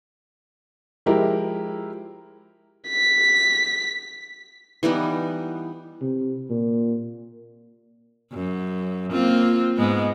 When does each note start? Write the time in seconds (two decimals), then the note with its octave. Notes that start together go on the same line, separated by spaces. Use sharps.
1.06 F3 G#3 E4 G4 A#4
2.89 B6
4.83 E3 G3 B3 D#4
6.01 C3
6.50 A#2
8.33 F#2
9.12 A#3 C4 F4
9.77 G#2 G#3 B3